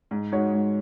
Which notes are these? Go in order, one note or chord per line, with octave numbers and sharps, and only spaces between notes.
G#2
G#3 D#4 F#4 C#5
G#2